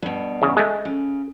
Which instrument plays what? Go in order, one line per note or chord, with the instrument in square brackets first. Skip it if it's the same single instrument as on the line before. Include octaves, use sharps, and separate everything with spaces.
[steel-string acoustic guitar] G2 B2
[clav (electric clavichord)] E2 C#3
G#3 A3
[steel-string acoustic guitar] C#3